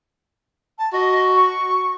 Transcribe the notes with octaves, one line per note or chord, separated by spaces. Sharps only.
A5
F#4 D#5
C#6